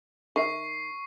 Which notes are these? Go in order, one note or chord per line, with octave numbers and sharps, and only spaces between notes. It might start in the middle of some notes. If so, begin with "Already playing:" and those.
D#3 E5 C#6 C7